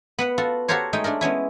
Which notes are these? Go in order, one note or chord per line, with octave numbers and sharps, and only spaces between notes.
B3 B4 F#5
F4 F#4 A4
F#4 G4 A4 A#4 C5 C#5
G#3 A3 D#4 G5
A3 D4 A4 A#4
G#3 B3 C#4 E4